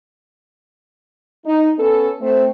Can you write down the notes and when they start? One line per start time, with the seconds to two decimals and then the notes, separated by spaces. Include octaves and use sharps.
1.46 D#4
1.78 B3 C#4 A4
2.21 A3 C4